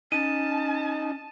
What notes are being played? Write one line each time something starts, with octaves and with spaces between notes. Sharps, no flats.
C#4 D#4 A5 D#7